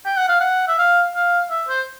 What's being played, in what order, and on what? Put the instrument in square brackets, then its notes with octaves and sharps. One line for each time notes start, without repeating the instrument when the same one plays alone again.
[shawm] G5
F#5
F5
F#5
E5
F5
F5
E5
C5